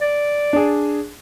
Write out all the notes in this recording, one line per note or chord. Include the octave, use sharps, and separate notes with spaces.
D5
D4 G#4